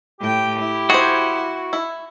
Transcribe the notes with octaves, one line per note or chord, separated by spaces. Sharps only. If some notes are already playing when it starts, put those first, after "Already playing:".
A2 G4 G5
E4
F#4 G#4 C5
E4